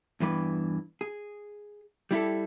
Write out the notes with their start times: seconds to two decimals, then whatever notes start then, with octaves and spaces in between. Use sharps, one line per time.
0.20 E2 G2 E3 B4
1.01 G#4
2.11 G3 E4 G4 A4